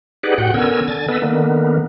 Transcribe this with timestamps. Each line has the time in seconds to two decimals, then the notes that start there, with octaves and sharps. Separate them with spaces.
0.23 D#4 G4 G#4 B4 D5 F#5
0.38 A2 F#4 F#5 G5
0.54 D3 B3 C#4 A#4 G#5 E6
0.88 D3 G#5 A6
1.08 B3 A4 B4 D#5 E6
1.22 D3 D#3 A#3 B3